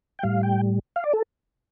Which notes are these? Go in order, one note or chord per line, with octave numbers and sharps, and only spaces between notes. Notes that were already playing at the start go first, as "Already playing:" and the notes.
G5
A2 G3 F5
G5
F5
D5
A4